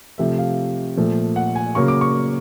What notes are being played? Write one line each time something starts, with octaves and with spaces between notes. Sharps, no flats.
C3 F3 A3 E5
F5
A#2 F3 A3
F#5
G#5
C#3 F#3 A#3 C#6
D6
C#6